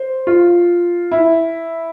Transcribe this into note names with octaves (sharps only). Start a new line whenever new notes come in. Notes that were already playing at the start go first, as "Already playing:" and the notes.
Already playing: C5
F4
E4